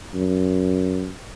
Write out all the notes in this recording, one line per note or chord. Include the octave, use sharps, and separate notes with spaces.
F#2